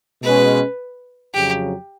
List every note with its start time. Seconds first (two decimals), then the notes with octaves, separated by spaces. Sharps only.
0.22 B2 G#3 C#4 B4
1.34 F2 C#3 F#3 G4